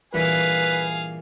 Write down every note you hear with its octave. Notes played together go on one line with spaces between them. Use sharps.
G2 A#2 E3 G#4 B4 F5